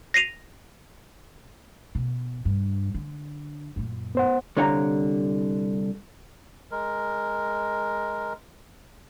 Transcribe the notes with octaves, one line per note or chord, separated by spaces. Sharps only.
A#6 C7 D#7 F7
B2
G2
D3
F#2 A#2
B3 C5 F#5
C2 D3 C#5 F5 F#5 A#5
G#3 A#4